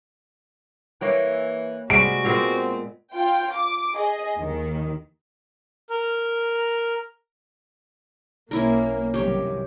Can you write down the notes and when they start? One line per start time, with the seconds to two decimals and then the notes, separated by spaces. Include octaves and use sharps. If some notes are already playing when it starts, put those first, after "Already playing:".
1.01 E3 A#3 C#5 G5
1.90 C3 G3 G#3 F#4 D7
2.25 A#2 G#3 B3 C4
3.13 F4 G5
3.53 D6
3.96 G#4 D#5
4.38 D#2 D#3
5.90 A#4
8.51 B1 A#3 C#4 E4 A#4
9.14 C2 F#2 D#3 G4 C#5